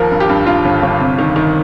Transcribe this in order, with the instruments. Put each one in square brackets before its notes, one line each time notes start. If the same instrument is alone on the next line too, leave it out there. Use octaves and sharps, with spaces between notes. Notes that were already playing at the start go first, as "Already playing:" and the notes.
Already playing: [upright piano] D#2 F3 A#4
G2
G4
G2
G2 F4
G1
G1
C3
D#3
D#3